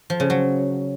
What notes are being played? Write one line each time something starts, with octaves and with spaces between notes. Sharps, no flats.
F3
C#3
F#3